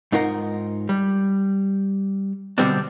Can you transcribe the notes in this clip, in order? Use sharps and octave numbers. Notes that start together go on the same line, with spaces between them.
G#2 D#4 F4 A#4 F#5
G3
B2 D3 G3 C4 D4